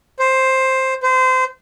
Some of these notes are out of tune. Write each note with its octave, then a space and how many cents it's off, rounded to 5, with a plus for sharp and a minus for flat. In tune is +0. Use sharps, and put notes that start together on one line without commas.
C5 +10
C5 -25